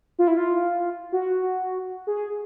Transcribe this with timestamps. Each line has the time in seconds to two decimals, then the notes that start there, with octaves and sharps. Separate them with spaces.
0.19 F4
0.28 E4
0.37 F4
1.12 F#4
2.07 G#4